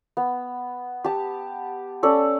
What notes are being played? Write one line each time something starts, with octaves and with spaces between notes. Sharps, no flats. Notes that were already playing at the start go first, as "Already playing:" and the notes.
B3
G4 A5
C#4 A4 D5